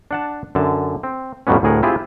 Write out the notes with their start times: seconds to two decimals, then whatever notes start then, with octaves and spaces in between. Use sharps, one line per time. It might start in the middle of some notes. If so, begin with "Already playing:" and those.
0.11 D4 F#5 A5
0.55 F#2 D3 A5
1.03 C4
1.47 F2 A2 F#3 G3 B3 C#4
1.63 D2 A2 G#4 A#4 F#5
1.83 C4 E4 F4 G4 G#4